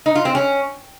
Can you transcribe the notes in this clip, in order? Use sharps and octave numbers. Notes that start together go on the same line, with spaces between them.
D#4
F4
C4
C#4